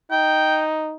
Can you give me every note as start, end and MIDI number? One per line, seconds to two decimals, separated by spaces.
0.11 0.96 63
0.11 0.63 79